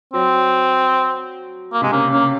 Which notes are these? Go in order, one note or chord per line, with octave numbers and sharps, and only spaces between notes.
F#3 C4
A#3
C3 G#3
C#3 A#3
C#3 A#3